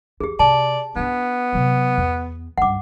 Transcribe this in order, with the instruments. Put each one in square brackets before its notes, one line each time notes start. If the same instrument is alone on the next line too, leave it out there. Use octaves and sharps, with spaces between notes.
[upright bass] F2 [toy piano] G4 G#4
[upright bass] C3 [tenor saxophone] D5 [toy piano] A5
[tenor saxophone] B3 [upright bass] D4 E4
[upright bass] C3 F#3
E2
[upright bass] C#2 G2 [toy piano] F#5 D6